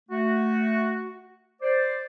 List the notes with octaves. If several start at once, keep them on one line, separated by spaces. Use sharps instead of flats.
A3 F#4
C5 D5